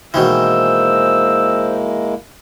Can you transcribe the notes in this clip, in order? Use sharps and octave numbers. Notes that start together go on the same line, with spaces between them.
B2 D#3 E3 G#3 A#3 E4 C5 E6